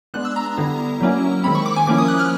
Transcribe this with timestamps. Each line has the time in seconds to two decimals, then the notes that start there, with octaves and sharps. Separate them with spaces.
0.14 G#3 B3 D4 F#6
0.25 E6
0.36 A#5
0.46 A#5
0.57 D3 G3 B3 E4
1.01 F#3 A#3 C#4 E4
1.44 D#3 G#3 C4 B5
1.55 C#6
1.66 D6
1.76 G#5
1.87 F3 A#3 C#4 E4 D6
1.98 D#6
2.08 F#6
2.19 F6